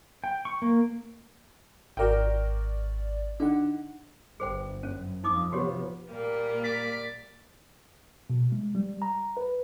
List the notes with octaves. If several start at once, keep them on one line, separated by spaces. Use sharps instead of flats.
G5
C#6
A#3
G#1 F#4 A#4 D5 G5
D3 D#4 F#5
G1 G#4 C5 G5
F#2 C#4
F2 F3 D#4 D6 D#6
C3 F3 B3 F#4 G4 C#5
A#2 G3 A#3
D5 B6
B2
G#3
G3
A#5
B4